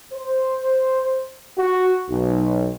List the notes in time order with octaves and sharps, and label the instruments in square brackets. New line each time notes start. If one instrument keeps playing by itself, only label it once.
[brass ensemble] C5
F#4
B1